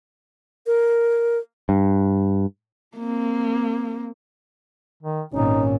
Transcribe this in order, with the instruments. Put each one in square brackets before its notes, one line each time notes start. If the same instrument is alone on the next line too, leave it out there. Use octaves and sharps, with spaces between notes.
[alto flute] A#4
[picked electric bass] G2
[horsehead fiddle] A#3 C4
[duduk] D#3
[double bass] G#1 A#2 [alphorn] C#4 [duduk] D#4